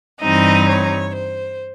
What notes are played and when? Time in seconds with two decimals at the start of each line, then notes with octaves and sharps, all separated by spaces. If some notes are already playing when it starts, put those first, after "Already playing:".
0.21 G2 E3 G3 C4 D#4 D#5
0.68 C#5
1.16 C5